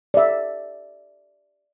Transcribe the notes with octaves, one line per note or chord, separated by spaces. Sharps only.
D5 E5